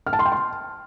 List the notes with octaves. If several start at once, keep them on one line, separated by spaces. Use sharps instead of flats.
F6
A5
C6
G5
C6